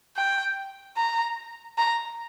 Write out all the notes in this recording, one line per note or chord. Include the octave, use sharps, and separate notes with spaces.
G5
A#5
A#5